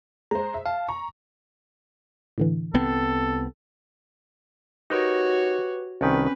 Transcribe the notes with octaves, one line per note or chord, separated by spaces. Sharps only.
G#3 C5 A#5
E5
F5 A5
A#5 C#6
A2 D3 E3
C2 B3 C4 A4
D#4 F#4 G4 A#4 B4 C#5
C2 D#3 C4 C#4 B4